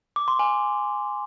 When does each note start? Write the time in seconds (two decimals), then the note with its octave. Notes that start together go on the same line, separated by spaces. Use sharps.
0.16 D6
0.28 C6
0.39 G#5